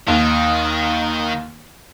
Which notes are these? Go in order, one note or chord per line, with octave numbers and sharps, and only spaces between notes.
D#2 D#3